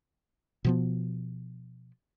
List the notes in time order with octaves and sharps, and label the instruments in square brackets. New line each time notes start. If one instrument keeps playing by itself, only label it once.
[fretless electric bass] B2 F3 B3